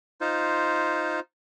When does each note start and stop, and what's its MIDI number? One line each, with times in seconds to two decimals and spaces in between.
0.21 1.20 63
0.21 1.20 65
0.21 1.20 72